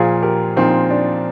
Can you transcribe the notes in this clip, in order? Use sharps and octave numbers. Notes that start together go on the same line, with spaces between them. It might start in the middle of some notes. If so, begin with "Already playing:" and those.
Already playing: A#2 F3 F4 G#4
G4 A#4
A#2 F3 C4 D#4
D4